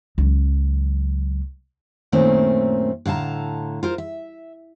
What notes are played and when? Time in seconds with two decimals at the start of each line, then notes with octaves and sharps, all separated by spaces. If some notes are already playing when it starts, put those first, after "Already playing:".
0.18 C#2 F#3
2.12 F#2 A#2 D#3 A3 C4 C#4
3.06 A2 D3 F5 A5 A#5
3.83 F4 A#4 C5
3.98 E5